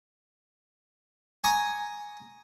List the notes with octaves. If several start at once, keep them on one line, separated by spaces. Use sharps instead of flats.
G#5 A#5 C#6 D#6